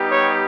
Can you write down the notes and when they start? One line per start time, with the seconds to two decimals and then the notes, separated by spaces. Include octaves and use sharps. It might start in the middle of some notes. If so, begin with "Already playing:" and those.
Already playing: G3 B3 D#4 G4
0.11 C#5